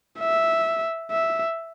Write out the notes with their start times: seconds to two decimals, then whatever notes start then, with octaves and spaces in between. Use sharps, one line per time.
0.20 E5
1.11 E5